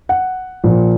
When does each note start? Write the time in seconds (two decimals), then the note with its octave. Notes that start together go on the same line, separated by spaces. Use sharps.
0.09 F#5
0.64 A#2 F3